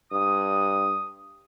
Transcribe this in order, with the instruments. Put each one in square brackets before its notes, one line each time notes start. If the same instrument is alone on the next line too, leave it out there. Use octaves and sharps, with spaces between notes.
[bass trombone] G2 [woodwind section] D#6